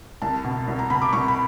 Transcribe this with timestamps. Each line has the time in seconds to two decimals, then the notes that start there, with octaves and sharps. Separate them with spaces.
0.22 C2 A5
0.45 B2
0.67 C2
0.79 A#5
0.90 B2 B5
1.02 D6
1.13 C2 C#6
1.28 B5